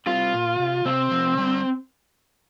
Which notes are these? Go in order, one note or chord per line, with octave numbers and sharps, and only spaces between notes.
G3 C4 F4
A#2
C3
C3 C4
C3 F3
D3 G3